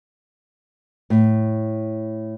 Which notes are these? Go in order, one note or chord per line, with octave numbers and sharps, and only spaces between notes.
A2